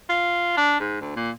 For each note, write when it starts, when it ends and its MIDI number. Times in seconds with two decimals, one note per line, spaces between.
0.09 0.54 65
0.57 0.78 62
0.80 0.98 44
1.01 1.13 38
1.16 1.30 46